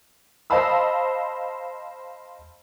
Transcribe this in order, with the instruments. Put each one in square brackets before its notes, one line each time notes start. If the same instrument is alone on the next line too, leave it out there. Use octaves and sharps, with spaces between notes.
[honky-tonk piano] C5 D#5 F5 A5 B5 E6